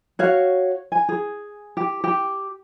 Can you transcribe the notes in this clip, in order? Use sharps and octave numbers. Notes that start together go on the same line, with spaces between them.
F#4 C#5 F5
G#5
G#4
G4
G4